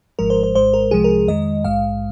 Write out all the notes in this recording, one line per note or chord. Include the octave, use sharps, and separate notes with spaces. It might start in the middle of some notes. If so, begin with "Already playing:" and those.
G#1 G#2 F3 G#3 A#4
C5
C5
G#1 G#2 G#3 C5
A#4
C2 C3 F3 G#3 G#4
A#4
F2 D#3 G#3 D#5
A#1 G#2 G#3 F5